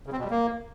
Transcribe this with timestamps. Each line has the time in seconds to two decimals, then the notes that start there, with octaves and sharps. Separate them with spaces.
0.07 C#3
0.12 C4
0.18 B2
0.24 G3
0.30 A#3